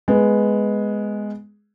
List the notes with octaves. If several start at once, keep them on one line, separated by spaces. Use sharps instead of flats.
G#3 B3